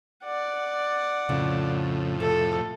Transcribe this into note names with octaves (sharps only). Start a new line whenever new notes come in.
D5 F#5
F2 A2 C#3
C3 A4